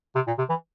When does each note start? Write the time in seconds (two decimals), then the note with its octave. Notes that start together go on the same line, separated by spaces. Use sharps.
0.15 C3
0.27 A#2
0.38 C3
0.49 E3